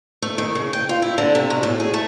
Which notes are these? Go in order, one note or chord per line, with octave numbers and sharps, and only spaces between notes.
A3
D#3
C#3
G5
F4
E4
D3
C3
B2
A2
G#4
A3